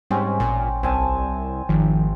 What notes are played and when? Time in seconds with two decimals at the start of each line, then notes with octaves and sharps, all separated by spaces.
0.11 G#2 G3 C4 C#4
0.40 A1 A#2
0.83 C2 C4 G#5 A5
1.69 G#1 D#3 F3